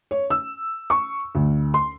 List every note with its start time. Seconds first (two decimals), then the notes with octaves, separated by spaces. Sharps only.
0.11 C#5
0.30 E6
0.90 C#6
1.35 D2
1.74 C6